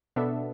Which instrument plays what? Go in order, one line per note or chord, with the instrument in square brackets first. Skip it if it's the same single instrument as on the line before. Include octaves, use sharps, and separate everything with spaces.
[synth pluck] B2 B3 D4 A4 E5